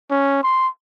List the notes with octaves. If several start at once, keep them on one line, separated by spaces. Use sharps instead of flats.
C#4
C6